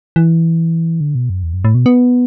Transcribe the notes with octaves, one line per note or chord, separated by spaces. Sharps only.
E3
D3
B2
F#2
E2
F#2
A2
B2
B3